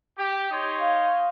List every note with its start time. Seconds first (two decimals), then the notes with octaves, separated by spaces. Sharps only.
0.18 G4
0.51 D#4 C#5 C6
0.79 F5